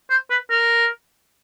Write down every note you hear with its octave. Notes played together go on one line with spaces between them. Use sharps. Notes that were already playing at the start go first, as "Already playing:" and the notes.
C5
B4
A#4